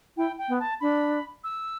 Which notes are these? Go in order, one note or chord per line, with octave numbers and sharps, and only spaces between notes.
E4 G5
G5
B3
A5
D4 B5
E6